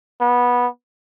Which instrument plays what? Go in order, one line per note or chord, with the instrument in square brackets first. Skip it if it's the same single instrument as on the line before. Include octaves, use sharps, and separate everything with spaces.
[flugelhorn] B3